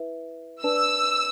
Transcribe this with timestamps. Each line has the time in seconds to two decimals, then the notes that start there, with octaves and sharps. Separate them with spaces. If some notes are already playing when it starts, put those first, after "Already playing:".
Already playing: E4 B4 E5
0.63 D4 B4 D5 A5 E6